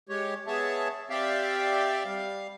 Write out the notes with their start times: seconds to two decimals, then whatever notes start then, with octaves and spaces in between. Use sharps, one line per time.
0.09 G#3 G4 C#5
0.47 G#3 B3 G#4 C#5 E5 A5
1.10 C4 G4 D5 E5 F5 G5
2.05 G3 F5